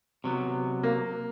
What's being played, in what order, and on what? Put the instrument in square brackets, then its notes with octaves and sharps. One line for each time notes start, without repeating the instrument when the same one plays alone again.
[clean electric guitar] C3 F#3 B3
[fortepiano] A#3